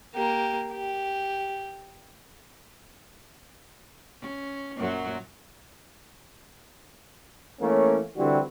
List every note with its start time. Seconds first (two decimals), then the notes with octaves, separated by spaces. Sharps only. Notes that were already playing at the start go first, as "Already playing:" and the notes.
0.15 A#3 G4
0.72 G4
4.21 C#4
4.77 F#2 A#2 F#3
7.61 E3 A3 A#3 C#4
8.17 D3 E3 G3 C4 F#4